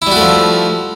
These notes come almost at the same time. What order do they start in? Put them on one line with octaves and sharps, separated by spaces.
E4 G3 F#4 A3 F3